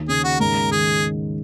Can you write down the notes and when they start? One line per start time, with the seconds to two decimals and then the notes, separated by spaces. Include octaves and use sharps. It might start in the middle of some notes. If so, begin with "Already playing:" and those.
Already playing: D#2
0.09 C#3 G#4
0.24 F#4
0.40 G#2 A#4
0.72 D#3 G#4